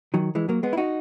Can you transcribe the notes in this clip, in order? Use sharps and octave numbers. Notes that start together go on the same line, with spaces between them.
D#3 F#3
E3 G#3
F#3 A#3
G#3 B3
E4
D#4 F#4